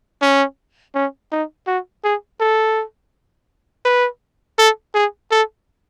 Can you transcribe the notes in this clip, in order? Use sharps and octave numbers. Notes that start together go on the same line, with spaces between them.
C#4
C#4
D#4
F#4
G#4
A4
B4
A4
G#4
A4